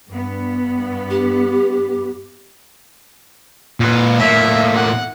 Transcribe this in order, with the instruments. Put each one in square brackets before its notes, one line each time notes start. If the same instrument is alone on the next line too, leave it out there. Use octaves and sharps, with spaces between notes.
[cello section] G2 B3
[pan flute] G4
[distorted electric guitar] A#2 B4
[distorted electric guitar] A2 A#3 [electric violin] E5
[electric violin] F#5